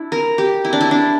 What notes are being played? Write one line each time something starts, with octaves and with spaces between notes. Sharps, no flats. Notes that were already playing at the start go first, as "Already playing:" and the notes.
Already playing: D4 E4
A#4
G4
E4
D4
E4
D4